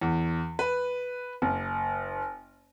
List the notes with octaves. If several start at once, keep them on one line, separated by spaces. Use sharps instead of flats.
E2
B4
F#1